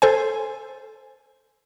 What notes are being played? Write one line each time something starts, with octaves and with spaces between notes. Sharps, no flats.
A4 C5 G#5